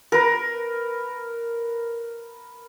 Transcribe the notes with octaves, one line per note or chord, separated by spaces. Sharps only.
A#4 B4